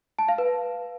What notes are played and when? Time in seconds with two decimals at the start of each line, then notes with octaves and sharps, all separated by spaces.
0.19 A5
0.28 F5
0.38 B4